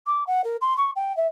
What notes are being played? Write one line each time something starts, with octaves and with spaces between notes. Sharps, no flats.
D6
F#5
A#4
C6
C#6
G5
E5